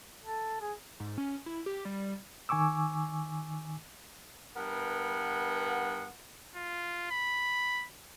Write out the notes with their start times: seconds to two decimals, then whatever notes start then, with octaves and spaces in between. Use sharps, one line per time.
0.22 A4
0.61 G#4
1.00 G#2
1.18 C#4
1.46 E4
1.66 G4
1.85 G3
2.49 D#3 G#5 C#6 D6 E6
4.55 G2 B3 A#4 F#5
6.55 F4
7.11 B5